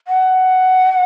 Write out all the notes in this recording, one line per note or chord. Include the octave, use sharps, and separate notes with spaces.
F#5